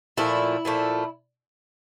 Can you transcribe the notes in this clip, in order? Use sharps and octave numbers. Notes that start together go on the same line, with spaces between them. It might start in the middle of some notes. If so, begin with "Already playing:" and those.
A#2 F3 A3 E4
A#2 F3 A3